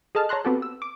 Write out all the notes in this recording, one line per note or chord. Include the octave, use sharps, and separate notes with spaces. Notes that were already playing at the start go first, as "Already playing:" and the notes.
G#4 A4 D#5 A5 F6
C#5 A5 A#5 C6 F#6
B3 C4 F#4 G4 A4
E6
D6